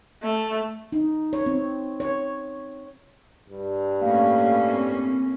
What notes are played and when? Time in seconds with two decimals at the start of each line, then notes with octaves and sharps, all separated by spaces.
0.23 A3
0.92 D#4
1.33 C#5
1.46 C4
2.00 C#5
3.50 G2
4.01 A2 A#3 C#4 F5
4.71 C4